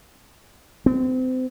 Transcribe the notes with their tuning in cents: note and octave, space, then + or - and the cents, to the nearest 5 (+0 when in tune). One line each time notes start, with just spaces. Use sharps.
C4 -30